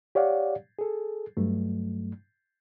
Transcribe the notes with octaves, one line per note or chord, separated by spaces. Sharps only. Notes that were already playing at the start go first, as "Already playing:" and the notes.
G4 C#5 D5 F5 F#5
G#4 A4
G2 F#3 A3